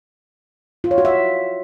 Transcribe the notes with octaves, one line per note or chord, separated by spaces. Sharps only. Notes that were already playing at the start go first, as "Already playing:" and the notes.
F4
C#5
F#4
E5